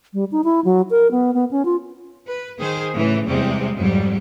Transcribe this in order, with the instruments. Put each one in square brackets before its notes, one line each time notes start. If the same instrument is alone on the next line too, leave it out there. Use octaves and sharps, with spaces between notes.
[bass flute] G3
D#4
E4
F#3
A#4
B3
B3
C#4
F4
[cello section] B4
D#3 G#4 C5
A2 C#3 E3
E2 C3 G3 G#3 C4
F2 G#2 F#3 G3